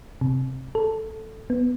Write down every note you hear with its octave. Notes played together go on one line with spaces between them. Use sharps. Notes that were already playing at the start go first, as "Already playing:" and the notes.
C3
A4
B3